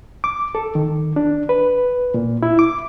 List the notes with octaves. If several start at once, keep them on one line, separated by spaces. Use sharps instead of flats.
D6
A4
D#3
D4
B4
A#2
E4
D6